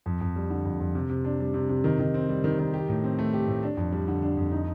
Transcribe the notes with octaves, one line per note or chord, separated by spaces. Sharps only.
F2
F2
G3
D3
F2
F2
C3
C3
D4
G3
C3
C3
D#3
D#3
C4
G3
D#3
D#3
G4
A2
C4
A3
G4
A2
D4
F2
G3
D3
D4
F2
D#4